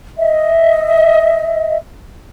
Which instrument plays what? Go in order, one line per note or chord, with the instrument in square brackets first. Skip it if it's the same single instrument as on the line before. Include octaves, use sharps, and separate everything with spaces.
[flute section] D#5 E5